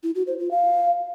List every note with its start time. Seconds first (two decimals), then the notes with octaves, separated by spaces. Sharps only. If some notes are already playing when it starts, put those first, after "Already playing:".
0.03 E4
0.15 F#4
0.27 C5
0.39 F4
0.51 F5